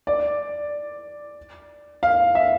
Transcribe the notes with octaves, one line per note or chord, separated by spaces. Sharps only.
D5
F5
E5